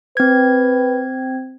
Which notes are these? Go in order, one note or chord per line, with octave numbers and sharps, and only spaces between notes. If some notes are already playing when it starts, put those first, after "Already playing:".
C4 B4 G#6